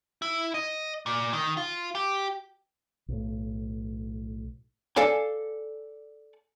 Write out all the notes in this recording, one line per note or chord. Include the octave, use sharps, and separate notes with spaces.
E4
D#5
A#2
D#3
F4
G4
B1 A2
A4 D5 F5 G#5